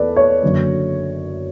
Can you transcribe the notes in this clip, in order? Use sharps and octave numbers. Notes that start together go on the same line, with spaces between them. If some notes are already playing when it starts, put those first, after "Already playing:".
Already playing: E2 A4 B4 D5
C#5
F#1 F#2 D3